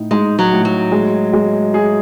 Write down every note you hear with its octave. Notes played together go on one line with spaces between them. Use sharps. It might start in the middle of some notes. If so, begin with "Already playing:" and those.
Already playing: A2 D#4
G#3 D#4
F#3
A2
F#3
G#3
G#3
G#4